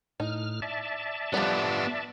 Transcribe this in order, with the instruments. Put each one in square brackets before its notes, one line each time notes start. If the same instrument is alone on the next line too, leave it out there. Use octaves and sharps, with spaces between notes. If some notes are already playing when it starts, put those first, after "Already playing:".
[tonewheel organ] A2 F6 [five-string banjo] D#4
[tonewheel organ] D5 E5 A5
[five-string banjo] F3 G3 [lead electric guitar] B3 D4